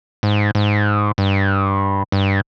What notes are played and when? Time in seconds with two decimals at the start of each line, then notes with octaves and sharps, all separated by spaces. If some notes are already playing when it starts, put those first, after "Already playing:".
0.23 G#2
0.55 G#2
1.18 G2
2.12 G2